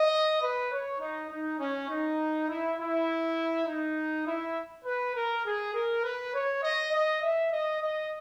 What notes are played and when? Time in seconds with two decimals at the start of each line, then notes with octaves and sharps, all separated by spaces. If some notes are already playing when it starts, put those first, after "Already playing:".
Already playing: D#5
0.42 B4
0.71 C#5
1.00 D#4
1.30 D#4
1.59 C#4
1.89 D#4
2.48 E4
2.78 E4
3.66 D#4
4.26 E4
4.84 B4
5.14 A#4
5.45 G#4
5.74 A#4
6.03 B4
6.34 C#5
6.62 D#5
6.93 D#5
7.21 E5
7.51 D#5
7.81 D#5